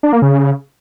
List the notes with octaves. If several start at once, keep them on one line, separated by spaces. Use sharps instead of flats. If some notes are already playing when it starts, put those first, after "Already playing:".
D4
A#3
C#3